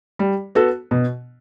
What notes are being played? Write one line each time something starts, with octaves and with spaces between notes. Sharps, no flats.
G3
B3 F#4 A4
B2